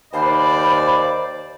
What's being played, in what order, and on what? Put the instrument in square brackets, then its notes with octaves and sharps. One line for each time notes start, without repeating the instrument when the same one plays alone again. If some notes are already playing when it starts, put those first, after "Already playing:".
[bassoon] D#2 [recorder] C5 [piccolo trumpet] D5 [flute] B5